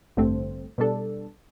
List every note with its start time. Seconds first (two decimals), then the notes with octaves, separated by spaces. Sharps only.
0.17 A1 G2 D3 A3 C4
0.78 B2 G3 D4 A4